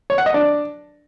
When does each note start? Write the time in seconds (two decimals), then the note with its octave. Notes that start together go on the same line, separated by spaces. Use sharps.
0.10 C#5
0.18 F#5
0.26 D#5
0.34 D4